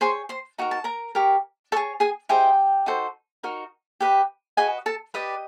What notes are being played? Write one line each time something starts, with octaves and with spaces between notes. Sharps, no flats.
G#4 C5 C#5 C6
C5 C6
D#4 F#4 A#4 A#5
A5
A#4 A#5
G4 A#4 C#5
G#4 A4 C#5 A5
G#4 G#5
E4 G4 G#4 C5 D#5 G5
D#4 F#4 A4 C5
D#4 F#4 A#4
G4 B4 D#5
F#4 G#4 B4 D#5 G#5
A4 A5
G4 B4 D5 D#5 D#6